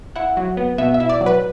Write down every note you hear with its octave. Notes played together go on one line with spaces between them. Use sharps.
E4 F#5
F#3
B3
B2 E5
E5
E4
D5
F#3
B4